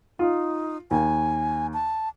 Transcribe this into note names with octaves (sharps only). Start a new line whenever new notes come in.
D#4 F4
D#2 G#5
A5